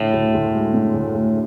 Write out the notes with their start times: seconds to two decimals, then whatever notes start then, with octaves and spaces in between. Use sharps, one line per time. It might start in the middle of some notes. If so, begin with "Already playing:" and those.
Already playing: A2 D3
0.13 D2
0.34 D2
0.54 G#3
0.74 D3
0.94 D2
1.14 D2